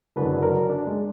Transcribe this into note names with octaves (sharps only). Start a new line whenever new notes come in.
F#1 F#2 D3 F#3 D4 B4
A#4
D4
G#3